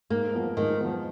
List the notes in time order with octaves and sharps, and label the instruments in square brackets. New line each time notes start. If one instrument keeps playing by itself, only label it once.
[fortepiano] G#2 [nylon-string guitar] A#3
[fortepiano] F3 B3
[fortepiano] G#2 [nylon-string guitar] D#3
[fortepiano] F3 B3